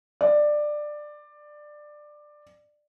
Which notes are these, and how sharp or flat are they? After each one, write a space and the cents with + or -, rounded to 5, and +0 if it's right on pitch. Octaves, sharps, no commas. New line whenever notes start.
D5 +15